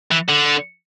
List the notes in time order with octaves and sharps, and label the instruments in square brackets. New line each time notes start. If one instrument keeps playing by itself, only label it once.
[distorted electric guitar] E3
D3